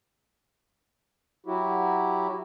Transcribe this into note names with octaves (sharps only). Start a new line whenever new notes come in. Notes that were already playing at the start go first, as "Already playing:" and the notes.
F#3 E4 F#4 G4